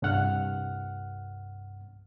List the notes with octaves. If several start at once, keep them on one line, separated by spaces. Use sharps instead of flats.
C2 G2 F#5 F6